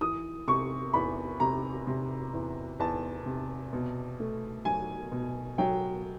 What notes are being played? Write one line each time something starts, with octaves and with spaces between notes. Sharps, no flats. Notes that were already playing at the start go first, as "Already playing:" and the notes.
E3 D#6
C3 C#6
E2 B5
C3 A#5
C3
E2
E2 A5
C3
B2
A3
F#3 G#5
B2
F#3 G5